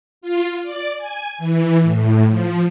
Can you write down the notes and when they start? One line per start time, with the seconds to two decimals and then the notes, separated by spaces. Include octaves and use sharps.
0.21 F4
0.62 D5
0.97 G#5
1.38 E3
1.82 A2
2.28 F3